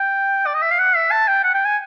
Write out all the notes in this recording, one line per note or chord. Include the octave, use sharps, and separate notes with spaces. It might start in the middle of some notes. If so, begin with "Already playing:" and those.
Already playing: G5
D5
D#5
E5
F5
F#5
E5
A5
G5
F#5
G5
G#5